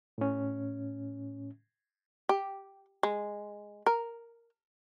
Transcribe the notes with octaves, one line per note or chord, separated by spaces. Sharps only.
A2 C#4
G4
G#3
A#4